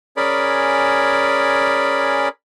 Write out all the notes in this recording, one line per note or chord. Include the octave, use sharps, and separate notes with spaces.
C#4 G#4 A#4 D5 B5